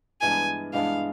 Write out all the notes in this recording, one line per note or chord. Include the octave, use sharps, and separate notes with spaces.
G2 E3 G#3 B3 D4 G#5
G2 E3 G#3 B3 D4 F5